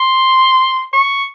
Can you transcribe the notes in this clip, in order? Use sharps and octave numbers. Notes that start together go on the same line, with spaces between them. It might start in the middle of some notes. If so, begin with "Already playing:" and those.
Already playing: C6
C#6